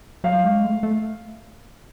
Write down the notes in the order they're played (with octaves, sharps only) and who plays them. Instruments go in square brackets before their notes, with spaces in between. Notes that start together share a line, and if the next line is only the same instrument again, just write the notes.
[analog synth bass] F#3 [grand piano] F5
[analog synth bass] G#3
A3
A3